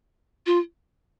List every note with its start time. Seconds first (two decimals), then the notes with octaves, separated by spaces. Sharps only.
0.46 F4